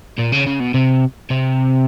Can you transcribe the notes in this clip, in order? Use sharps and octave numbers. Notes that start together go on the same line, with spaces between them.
A#2
C#3
C#3
B2
C3
C3